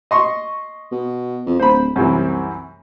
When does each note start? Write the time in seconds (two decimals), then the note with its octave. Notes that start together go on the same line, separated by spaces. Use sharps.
0.11 D#5 C6 C#6
0.91 B2
1.46 F2
1.60 D1 C5 B5
1.96 C2 F#2 C3 E3